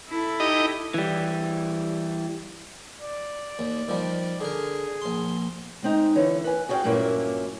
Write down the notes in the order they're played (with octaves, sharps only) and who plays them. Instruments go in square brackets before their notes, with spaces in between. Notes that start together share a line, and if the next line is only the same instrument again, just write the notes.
[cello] E4 A4
[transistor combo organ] D#4 G4 D#5
[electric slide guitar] E3 G3
[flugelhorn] D5
[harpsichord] D#2
D#3 F3 G3
[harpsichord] D3 A#4 [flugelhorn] G#4
[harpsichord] A#1 C6
[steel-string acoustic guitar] G#3 C4 D#4
D3 E3 C#5
B4 G#5
F#4 G#4 C#5 D#5 F5 G5
G2 A#2 F#3 A#3 C#4 E4